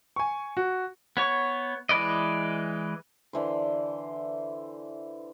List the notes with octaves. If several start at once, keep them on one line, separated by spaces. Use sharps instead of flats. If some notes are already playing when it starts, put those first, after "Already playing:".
G#5 C#6
F#4
B3 C#5 C#6
E3 G#3 B4 D5 D#5
D3 E3 C5